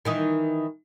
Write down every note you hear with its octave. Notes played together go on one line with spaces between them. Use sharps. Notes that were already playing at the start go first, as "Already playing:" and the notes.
D#3 E3 D#4